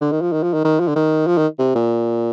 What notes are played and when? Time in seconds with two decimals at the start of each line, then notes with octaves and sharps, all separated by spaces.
0.01 D3
0.12 D#3
0.22 F3
0.33 D#3
0.43 F3
0.54 D#3
0.64 D#3
0.80 F3
0.88 D3
0.96 D#3
1.27 F3
1.38 D#3
1.59 C3
1.75 A#2